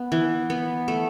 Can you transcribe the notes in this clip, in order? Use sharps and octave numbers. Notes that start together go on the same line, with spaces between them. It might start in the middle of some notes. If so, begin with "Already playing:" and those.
Already playing: B3
E3
B3
A3